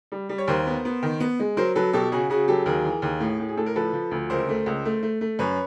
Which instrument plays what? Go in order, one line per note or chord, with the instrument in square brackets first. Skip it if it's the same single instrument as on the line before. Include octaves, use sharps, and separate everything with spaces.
[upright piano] G3
G3
C#5
D#2 A#4 C5
B3
B3
D#3
B3
G#3
F#3 A#4 C5
F#3 A4 B4
B2 G4 A4
C#3 F#4 G#4
C#3 F#4 G#4
F#3 G4 A4
D#2 G#4 A#4
E3
D#2
A2
A2
G#4
A2 A4
A#4
F3 A4 B4
F3
D2
C#2 A#4 C5
A3
C#2
A3
A3
A3
F#2 B4 C#5